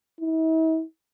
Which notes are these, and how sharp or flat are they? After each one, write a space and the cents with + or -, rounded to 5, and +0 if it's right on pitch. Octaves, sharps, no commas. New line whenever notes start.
E4 -45